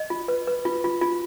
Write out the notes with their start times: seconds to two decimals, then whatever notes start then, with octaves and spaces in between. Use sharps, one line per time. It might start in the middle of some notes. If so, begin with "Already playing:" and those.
Already playing: D#5
0.10 F4
0.28 B4
0.47 B4
0.65 F4
0.84 F4
1.02 F4